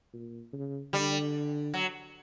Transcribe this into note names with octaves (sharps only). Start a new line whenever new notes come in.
A#2
C#3
D3 G3
F#3